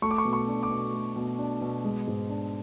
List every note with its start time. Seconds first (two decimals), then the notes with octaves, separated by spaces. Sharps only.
0.02 A3 C#6
0.11 D6
0.18 C#6
0.25 B2
0.33 C#6
0.48 D4
0.63 D6
0.70 B2
0.93 A3
1.16 B2
1.39 D4
1.61 B2
1.84 G#3
2.07 G#2
2.29 D4